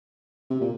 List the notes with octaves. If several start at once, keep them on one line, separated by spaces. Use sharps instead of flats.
C3
A#2